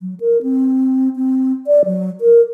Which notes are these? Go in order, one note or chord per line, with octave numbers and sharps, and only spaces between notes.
F#3
A#4
C4
C4
D5
F#3
A#4